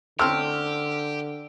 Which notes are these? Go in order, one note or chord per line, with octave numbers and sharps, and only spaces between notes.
D3 A3 C4 C#4 G4 E6 F6